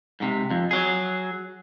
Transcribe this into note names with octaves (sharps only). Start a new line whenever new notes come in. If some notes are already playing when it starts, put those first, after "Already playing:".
G#2 C3
F2
F#3 G#4